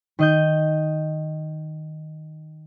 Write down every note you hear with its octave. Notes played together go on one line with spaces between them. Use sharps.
D#3 D#5 G6